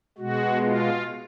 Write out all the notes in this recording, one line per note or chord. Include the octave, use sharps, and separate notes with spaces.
B2 G#3 F#4
F4